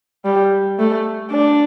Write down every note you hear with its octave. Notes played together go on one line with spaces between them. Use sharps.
G3
A3
D4